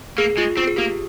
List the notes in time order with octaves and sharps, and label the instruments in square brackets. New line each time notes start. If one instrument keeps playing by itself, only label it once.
[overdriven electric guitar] A#3 [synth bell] G#4
[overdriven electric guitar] G#3 [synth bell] F4
[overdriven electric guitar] C4 [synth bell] F4
[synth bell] G#4
[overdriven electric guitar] A#3 [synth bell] G4